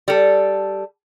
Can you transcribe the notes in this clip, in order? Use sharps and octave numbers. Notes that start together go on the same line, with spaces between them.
G3 A4